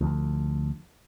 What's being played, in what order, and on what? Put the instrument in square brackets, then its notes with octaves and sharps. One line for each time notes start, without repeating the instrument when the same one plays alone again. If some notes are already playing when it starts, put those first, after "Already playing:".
[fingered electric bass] D2 F3